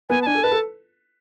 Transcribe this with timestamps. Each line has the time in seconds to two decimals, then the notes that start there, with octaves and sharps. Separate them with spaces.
0.10 B3 G#5
0.22 A5
0.26 D4 G#5
0.35 A4
0.43 B4 A5
0.52 A4